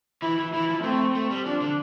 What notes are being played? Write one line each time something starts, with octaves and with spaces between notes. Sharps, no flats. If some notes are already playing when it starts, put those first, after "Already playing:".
E3 E4
E3
E3 E4
F3
A3 C4
A3
G3
F3 D4
D3